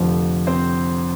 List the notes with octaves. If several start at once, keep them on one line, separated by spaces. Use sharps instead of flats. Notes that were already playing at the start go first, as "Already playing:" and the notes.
Already playing: F1 F2 D3 F3
C4 C5